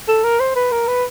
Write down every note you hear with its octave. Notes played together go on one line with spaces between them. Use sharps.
A4
A#4
C5
B4
A#4
B4